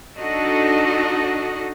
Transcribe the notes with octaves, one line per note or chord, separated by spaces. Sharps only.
D4 D#4 F#4 A4 D#5